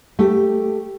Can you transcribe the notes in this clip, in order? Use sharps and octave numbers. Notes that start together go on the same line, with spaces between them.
A3 G4